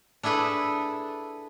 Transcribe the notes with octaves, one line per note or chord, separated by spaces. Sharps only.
D4 E4 G#4 A4 B4